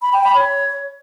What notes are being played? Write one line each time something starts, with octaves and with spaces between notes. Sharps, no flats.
B5
G5
B5
C#5